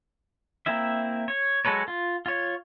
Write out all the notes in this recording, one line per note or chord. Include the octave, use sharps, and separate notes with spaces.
A#3 C4 E4 E5
C#5
F#3 G#3 A4 B4 C#5
F4
F4 C#5